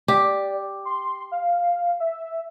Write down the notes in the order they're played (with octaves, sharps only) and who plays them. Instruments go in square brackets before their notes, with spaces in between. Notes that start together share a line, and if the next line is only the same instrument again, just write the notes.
[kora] G4 [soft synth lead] D5
[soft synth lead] C6
F5
E5